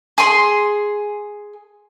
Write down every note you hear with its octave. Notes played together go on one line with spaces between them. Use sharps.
G#4 C6